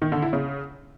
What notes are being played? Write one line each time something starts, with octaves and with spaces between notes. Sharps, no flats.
D#3
D3
E4
C#3